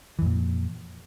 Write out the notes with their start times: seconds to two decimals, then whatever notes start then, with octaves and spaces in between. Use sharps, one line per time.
0.19 E3
0.22 F2
0.25 A#2